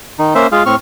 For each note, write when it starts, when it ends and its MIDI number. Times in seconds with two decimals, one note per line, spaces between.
0.19 0.34 51
0.19 0.34 63
0.35 0.47 58
0.35 0.47 61
0.35 0.47 72
0.35 0.47 76
0.52 0.63 56
0.52 0.63 65
0.52 0.63 68
0.52 0.63 77
0.66 0.76 45
0.66 0.76 60
0.66 0.76 85
0.66 0.76 89